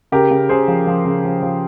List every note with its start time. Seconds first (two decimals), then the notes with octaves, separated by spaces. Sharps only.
0.12 C#3 G4 A#4
0.31 C#3
0.49 C#3 G#4 C5
0.68 F3
0.87 F3
1.05 C#3
1.24 F3
1.42 F3